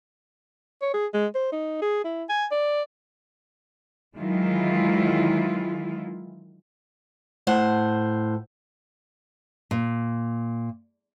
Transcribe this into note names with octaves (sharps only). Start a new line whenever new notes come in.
C#5
G#4
G#3
C5
D#4
G#4
E4
G#5
D5
D#3 E3 F#3 G#3 E4 F4
A2 C5 F#5
A#2